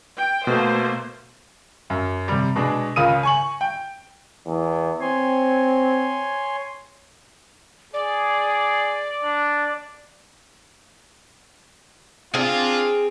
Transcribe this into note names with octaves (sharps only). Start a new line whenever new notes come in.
G5
B2 A3 A#3 C5
F#2
C3 G3
B2 G#3 D4
C#2 C#3 F4 A#4 D#6 D#7
G#5 C#6 F#7
G5
E2
C4 C#5 G#5 C6
G#4 D5
D4
C4 D4 F4 G#4